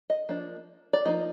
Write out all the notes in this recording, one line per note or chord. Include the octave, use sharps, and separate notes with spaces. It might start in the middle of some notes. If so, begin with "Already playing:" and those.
D#5
F3 A#3 D4
D5
F3 A#3 D#4 D#5